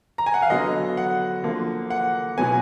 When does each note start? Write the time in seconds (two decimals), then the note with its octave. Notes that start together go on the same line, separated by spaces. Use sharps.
0.18 A#5
0.26 G#5
0.34 F#5
0.42 F5
0.50 D3 F#3 B3 D#5
0.97 F#5
1.43 D3 F3 A#3
1.90 F#5
2.38 B2 F#3 B3 G#5